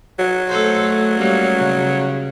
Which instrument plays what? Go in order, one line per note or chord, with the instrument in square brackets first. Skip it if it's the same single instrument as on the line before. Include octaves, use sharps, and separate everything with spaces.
[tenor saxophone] F#3
[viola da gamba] A3 A4 C5
A3
G3 A#3 C#4
C#3